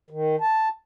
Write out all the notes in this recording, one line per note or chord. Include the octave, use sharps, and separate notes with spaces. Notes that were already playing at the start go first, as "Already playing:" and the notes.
D#3
A5